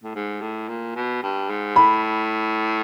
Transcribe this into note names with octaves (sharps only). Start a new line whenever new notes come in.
A2
G#2
A2
A#2
B2
G2
G#2
A2 B5